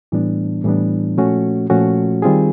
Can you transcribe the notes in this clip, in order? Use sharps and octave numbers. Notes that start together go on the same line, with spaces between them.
A2 E3 G3 B3 D4
A2 E3 G3 B3 D4
A#2 F3 A3 C#4 F#4
A#2 F3 A3 C#4 F#4
D#3 G3 C4 F4 G#4